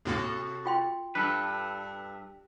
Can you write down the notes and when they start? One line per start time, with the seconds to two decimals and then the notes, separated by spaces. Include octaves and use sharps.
0.05 D#2 A2 C3 A#3 F#4 A4
0.66 F4 G5 C6
1.15 G2 A4 B4